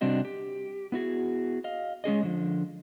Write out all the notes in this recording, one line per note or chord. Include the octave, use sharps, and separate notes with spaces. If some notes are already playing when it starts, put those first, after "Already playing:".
C3 G3 C4 D4 F#4 D#5
G4
B3 E4 F#4 G#4
D#5 F5
G#3 C#4 G#4 D#5
D3 F3